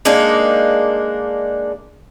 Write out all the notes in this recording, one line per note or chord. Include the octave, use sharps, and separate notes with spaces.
G#3 A#3 D4 D#4